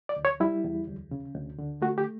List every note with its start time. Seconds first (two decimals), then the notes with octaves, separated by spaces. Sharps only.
0.09 D5
0.16 D2
0.25 C#5
0.40 G3 E4
0.64 E2
0.87 D2
1.11 C#3
1.35 D2
1.59 D3
1.82 A3 F#4
1.98 G4